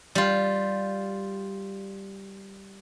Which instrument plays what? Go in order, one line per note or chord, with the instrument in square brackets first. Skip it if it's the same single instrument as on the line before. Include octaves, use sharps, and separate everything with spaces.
[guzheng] G3 F4